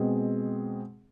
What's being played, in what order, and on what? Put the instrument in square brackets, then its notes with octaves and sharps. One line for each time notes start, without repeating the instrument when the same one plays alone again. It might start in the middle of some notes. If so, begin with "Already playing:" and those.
Already playing: [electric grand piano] B2 G#3 C4 G#4